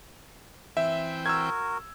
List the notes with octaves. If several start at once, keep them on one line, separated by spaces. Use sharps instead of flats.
E3 C4 E5 G5
F#4 A#4 E6 G#6